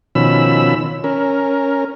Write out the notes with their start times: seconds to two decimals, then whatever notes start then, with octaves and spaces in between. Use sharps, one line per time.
0.15 B2 D#3 F3 C#4 B5 E6
1.04 C#4 A#4